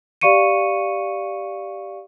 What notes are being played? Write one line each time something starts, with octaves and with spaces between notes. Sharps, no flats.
G4 D5 F5 C#6 C#7 D#7